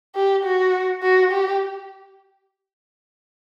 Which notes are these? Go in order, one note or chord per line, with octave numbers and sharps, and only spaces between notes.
G4
F#4
F#4
G4